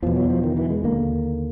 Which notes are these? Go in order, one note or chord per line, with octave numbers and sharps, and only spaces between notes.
E2 B2 F3
F#3
F3
D#3
E3
G#3
D#2 D3 A#3